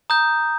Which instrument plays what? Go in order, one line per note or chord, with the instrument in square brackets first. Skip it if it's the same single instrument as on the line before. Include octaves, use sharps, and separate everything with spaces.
[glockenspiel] A#5 D#6 G6